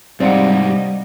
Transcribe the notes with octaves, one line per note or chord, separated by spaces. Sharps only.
G#2 C3 G3 C4 D5 D#5 F5 F#5